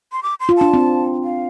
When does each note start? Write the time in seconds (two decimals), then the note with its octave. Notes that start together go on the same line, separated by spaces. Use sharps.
0.12 C6
0.23 D6
0.40 C6
0.49 F4
0.57 D4 A5
0.74 C4
1.24 F5